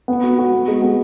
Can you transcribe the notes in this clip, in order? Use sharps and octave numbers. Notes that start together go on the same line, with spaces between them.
B3
F#4
F#4
B3
G#3
B3